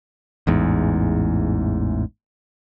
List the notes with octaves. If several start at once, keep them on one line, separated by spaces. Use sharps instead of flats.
A1 E2 G#2